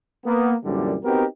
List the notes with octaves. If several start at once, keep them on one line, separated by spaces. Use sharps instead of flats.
A#3 B3
C2 F#2 A#2 D3 E3 G3
B3 C4 D#4 F#4 G4 A#4